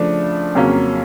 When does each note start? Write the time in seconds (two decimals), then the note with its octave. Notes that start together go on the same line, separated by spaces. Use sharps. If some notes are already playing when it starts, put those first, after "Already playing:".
Already playing: C#3 F3 A3 D4
0.55 F2 C#3 F#3 A#3 C#4